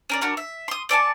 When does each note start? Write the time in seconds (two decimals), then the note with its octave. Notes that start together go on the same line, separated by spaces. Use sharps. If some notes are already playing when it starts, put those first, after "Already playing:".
0.10 C#4 A#4 D5
0.21 D4 F#4 A#4
0.37 E5
0.68 C6 D#6
0.89 A4 D5 G#5 A5